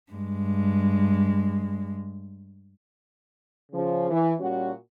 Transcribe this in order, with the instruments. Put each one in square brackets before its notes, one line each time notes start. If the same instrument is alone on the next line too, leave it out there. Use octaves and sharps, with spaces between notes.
[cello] G2 G#3
[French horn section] C#3 F3
E3
A#2 G3 C#4 F#4